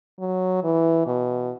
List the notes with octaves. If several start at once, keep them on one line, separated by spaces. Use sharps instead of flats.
F#3
E3
B2